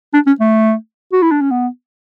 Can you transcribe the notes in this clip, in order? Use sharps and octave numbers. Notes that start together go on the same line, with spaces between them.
D4
C#4
A3
F#4
E4
D4
C#4
B3